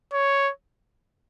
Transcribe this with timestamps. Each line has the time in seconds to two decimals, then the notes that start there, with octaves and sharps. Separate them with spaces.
0.13 C#5